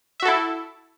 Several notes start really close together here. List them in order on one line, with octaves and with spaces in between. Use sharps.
E5 F#4 A4 E4